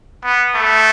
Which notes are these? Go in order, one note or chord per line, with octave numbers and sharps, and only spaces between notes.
B3
A3